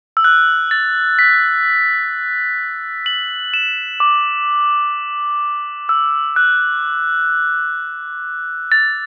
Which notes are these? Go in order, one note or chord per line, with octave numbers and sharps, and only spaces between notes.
E6
F#6
A6
B6
F#7
E7
D6
E6
F#6
A6